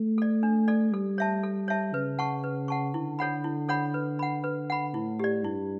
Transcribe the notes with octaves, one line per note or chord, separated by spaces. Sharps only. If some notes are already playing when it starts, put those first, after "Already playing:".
Already playing: A3
A4 D5
D4
A4 D5
G3 A4
C#5 E5 A5
A4
C#5 E5 A5
C#3 B4
F#5 A5 C#6
B4
F#5 A5 C#6
D3 E4
A4 C#5 F#5 B5
E4
A4 C#5 F#5 B5
B4
F#5 B5
B4
F#5 B5
A2 E4
G4 D5
G2 E4